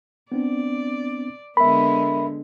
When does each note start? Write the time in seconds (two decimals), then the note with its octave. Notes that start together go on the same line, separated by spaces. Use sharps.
0.32 B3 C4 D4 D5
1.57 D3 G#3 B3 A#4 E5 B5